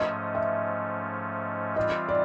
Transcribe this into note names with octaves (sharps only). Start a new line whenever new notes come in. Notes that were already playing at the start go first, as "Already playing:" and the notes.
Already playing: G#2 F3 A3 C#4 D#5
E5
E3 G3 C4 F4 D#5
D5